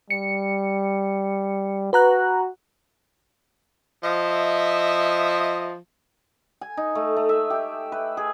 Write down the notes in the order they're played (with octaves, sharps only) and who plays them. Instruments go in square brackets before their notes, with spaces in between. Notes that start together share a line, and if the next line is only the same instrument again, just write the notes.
[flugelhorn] G3 [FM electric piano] C#7
[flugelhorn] F#4 [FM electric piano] B4 A#5 F#6
[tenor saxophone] F3 [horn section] D#5 E5
[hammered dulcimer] G#5
D#4
A3
A3
E5
G4
B4
G#4